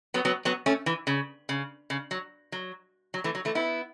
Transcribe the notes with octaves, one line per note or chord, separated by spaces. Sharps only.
F#3 B3
F#3 B3
F#3 B3
A3 C#4
E3
C#3
C#3
C#3
F#3
F#3
F#3
E3 A3
F#3
E3 A3
B3 E4